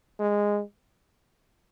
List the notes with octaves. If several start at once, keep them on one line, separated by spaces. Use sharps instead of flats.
G#3